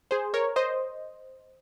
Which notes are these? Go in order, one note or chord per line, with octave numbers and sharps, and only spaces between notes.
G#4 C5
A#4 C#5
C5 D#5